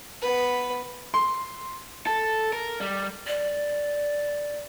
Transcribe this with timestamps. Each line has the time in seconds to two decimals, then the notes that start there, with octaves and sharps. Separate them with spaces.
0.22 B3 B4
1.14 C6
2.07 A4
2.53 A#4
2.80 G3
3.27 D5